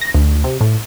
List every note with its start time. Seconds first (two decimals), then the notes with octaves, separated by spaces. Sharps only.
0.01 A#6
0.14 D2
0.44 C3
0.61 A2